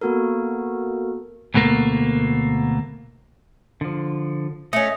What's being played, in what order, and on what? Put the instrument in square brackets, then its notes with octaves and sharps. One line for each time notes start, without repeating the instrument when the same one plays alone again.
[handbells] A#3 B3 F#4 A4 A#4
[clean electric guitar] D2 B2 A3 A#3
[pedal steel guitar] D3 F3
[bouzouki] A3 C#4 [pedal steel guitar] D#5